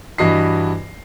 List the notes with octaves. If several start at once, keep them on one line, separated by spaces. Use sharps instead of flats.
G2 E3 F#4 D#5 C7